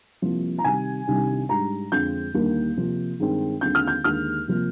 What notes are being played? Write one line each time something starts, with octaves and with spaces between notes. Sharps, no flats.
C2 C3 F3 A#3
A#5
C3 D#3 G3 G#5
C2 C3 D#3 G3 D4
G#2 G3 D4 A#5
F2 D3 G#3 C4 G6
D#2 D3 G3 A#3 D4
C3 F3 A#3
G2 D#3 G#3 C4
D#2 D3 G#3 C4 G6
F6
G6
D#2 D3 G#3 F6
C3 F3 A#3